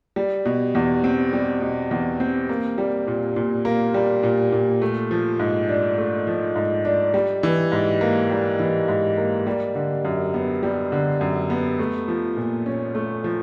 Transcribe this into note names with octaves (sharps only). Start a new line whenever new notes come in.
G3
B2
E2
C4
G3
B2
E2
C4
A#3
G3
A#2
A#2
A#3
G3
A#2
A#2
A3
F3
G#2
D4
A3
F3
G#2
D4
G3
E3
G#2
A#3
G3
E3
G#2
A#3
G3
D3
F#2
B3
G3
D3
F#2
B3
A3
F3
A#2
C#4
A3
F3